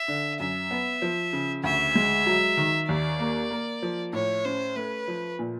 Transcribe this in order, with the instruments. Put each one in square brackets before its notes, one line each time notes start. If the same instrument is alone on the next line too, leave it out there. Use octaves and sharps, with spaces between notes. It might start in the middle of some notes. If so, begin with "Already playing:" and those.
Already playing: [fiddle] E5
[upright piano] D3
[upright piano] F#2 [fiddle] E5
[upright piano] B3
F3
C#3
[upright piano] D2 [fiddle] E5
[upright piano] G#3
F#3
D#3
[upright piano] D#2 [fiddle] D5
[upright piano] A#3
A#3
F3
[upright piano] A2 [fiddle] C#5
[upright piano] C#4 [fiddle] C5
[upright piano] A3 [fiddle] B4
[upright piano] F3
A#2